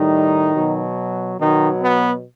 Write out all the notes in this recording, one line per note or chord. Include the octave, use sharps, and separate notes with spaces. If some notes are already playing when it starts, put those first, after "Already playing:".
Already playing: A2 D#3 G3 D#4
B2 F#3
B2 D#3 F#3 D#4
B3